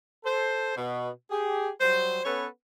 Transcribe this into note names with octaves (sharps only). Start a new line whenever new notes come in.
A4 C5
B2
G4 G#4
F#3 G3 C5
B3 C#4 A4 B4 C#5